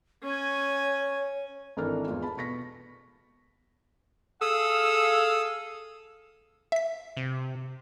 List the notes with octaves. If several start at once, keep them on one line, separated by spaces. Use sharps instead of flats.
C#4 C#5 G#5
G#1 E3 D4 A4 A#4 F6
E2 G#3 F4
A5 B5
B2 C#6 A#6 B6
G#4 A4 F5 D#6 E6
E5 B6
C3